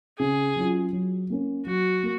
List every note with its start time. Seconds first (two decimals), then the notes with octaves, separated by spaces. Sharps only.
0.19 C#3 G#4
0.56 F#3 C#4 F4
0.93 F#3
1.30 A#3 C#4
1.66 F#3 F#4
2.03 A#3